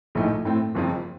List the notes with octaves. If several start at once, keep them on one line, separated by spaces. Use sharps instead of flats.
A#1 A2 F3 A3 D#4
A2 A3 C4
F#1 F2 C#3 F3 C4